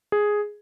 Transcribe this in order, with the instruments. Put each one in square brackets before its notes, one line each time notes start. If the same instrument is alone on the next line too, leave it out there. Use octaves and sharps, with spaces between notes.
[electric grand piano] G#4